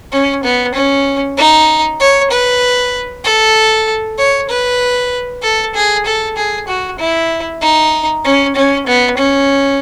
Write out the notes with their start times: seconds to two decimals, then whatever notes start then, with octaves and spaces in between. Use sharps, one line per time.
0.12 C#4
0.44 B3
0.74 C#4
1.37 D#4
2.00 C#5
2.31 B4
3.24 A4
4.18 C#5
4.49 B4
5.42 A4
5.75 G#4
6.06 A4
6.37 G#4
6.68 F#4
6.99 E4
7.62 D#4
8.25 C#4
8.56 C#4
8.87 B3
9.17 C#4